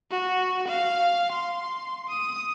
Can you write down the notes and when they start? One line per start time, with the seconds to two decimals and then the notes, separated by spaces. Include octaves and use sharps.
0.11 F#4
0.68 F5
1.32 C6
2.09 D#6